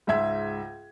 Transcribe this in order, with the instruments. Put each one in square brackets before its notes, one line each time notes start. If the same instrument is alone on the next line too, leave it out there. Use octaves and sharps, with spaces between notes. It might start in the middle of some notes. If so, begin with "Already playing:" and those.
[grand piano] C#2 G#2 E5 G#6